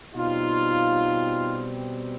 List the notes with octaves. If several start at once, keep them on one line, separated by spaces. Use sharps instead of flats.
B2 G3 C4 D#4 F4